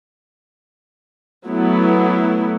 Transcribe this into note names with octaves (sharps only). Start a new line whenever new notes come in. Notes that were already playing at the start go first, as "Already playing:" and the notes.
F#3 A3 B3 E4